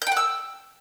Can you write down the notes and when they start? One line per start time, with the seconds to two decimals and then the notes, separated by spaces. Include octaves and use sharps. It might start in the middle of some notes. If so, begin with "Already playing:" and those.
0.02 G6
0.07 G5
0.12 F#5
0.17 E6